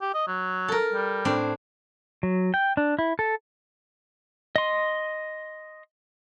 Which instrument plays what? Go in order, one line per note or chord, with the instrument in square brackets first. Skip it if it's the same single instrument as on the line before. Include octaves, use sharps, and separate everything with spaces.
[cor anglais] G4
D#5
F#3
[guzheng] A4 A#4
[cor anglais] G3
[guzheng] A2 C4 D4
[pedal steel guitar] F#3
G5
D4
E4
A4
D#5 C6